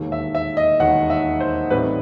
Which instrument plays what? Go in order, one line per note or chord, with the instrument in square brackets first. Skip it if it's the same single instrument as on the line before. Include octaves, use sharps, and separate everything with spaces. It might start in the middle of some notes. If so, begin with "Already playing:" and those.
Already playing: [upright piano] E1 D#2 D#3
E5
E5
D#5
E1 D#2 D#3 F#5
E5
C5
A1 A2 G3 C4 D#4 B4